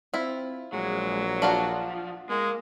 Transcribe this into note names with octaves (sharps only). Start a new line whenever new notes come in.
C4 E4 F4
A#1 F#3 G#3
F3 D4 F4 F#4
G#3 A#3